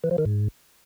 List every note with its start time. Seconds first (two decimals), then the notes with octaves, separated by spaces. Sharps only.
0.04 E3
0.11 F3
0.18 D#3
0.26 G#2